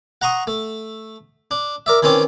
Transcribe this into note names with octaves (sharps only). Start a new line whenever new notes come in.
F#5 A#5 C6 C#6 D#6
A3
D4
A#4 D5 E5
D#3 E3 C4 C#4 D6